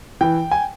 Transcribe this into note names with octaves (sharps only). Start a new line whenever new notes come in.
E3 G5
G#5